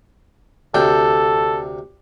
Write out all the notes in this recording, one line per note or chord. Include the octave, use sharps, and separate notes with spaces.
D2 C3 A4 G5